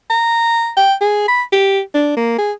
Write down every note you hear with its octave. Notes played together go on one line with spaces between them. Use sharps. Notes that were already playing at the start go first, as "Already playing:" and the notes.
A#5
G5
G#4
B5
G4
D4
A#3
G#4